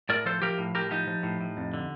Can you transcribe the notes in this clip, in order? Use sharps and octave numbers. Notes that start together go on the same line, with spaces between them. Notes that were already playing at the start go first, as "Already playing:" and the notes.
A2 A#4 D5
F3 A4 C5
F3 G4 A#4
A2
A2 G4 A#4
F3 D#4 G4
F3
A2
A2
F2
D3